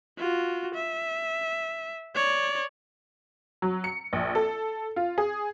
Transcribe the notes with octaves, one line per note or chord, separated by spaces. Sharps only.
F4 F#4
E5
C#5 D5
F#3
C#7
A#1
A4
F4
G#4